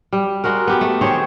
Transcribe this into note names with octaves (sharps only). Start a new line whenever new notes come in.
G3
G3 G#3 F#4 A#4
B3 G4
A3
D#3 C4 G#4 C#5